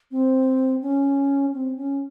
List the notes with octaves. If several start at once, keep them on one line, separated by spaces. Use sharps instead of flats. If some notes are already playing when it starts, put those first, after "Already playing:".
C4
C#4
C4
C#4